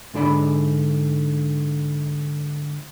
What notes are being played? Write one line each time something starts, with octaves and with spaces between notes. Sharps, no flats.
G#2 D3 G#4 D5 B5